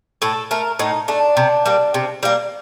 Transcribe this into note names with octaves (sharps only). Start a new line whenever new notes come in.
A2 A4
A3 A#4
A2 D#4
A3 D4
C3
G3 A#3
C3
G3 A#3